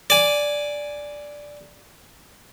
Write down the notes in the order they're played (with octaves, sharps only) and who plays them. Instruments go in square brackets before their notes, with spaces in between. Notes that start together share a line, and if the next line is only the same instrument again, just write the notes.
[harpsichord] D5 G#5